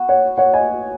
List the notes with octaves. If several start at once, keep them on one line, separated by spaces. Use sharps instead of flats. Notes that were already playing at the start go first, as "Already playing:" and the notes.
Already playing: B3 F#4
C#5 F#5
C#5 F#5
D#5 G#5